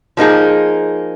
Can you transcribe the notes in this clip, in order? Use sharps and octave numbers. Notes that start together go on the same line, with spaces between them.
F3 A#3 D#4 G#4